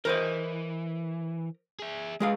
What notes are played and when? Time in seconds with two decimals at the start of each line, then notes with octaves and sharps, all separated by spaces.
0.05 E3 A#4 C5 D#5
1.79 G#4 E5
2.20 G#3 G#4 F5